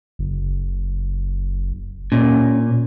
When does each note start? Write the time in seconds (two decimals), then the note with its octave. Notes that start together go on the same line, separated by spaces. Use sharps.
0.19 F#1
2.12 A#2 C#4